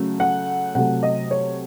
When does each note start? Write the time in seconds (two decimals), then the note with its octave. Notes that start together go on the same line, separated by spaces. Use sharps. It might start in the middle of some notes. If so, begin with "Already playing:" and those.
Already playing: C#3 F#3 A3
0.20 F#5
0.75 C3 F#3 A3 F#5
1.03 D#5
1.31 C#5